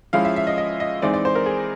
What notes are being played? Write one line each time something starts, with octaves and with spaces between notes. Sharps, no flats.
F3 G#3 C#4 E4 F5
E5
E5
D#5
D#5
D#5
E3 G#3 C4 D#4 D5
D5
C5
A#4
G#4